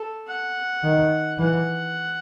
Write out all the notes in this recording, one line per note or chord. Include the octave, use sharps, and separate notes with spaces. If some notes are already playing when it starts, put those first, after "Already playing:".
Already playing: A4
F#5
D#3
E3 F#5